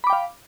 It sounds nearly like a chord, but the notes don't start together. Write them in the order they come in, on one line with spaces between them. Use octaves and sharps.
B5 D6 G5 F5